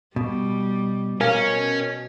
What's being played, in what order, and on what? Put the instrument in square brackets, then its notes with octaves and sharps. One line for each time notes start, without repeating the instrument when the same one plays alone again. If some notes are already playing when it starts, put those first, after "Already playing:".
[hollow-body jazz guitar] B2 [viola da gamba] G3
[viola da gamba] B2 [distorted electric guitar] C#4 [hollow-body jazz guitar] A#4 F5 G#5